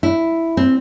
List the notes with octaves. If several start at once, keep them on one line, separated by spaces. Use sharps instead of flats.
E4
C4